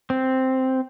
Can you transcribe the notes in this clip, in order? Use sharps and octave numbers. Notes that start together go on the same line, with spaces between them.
C4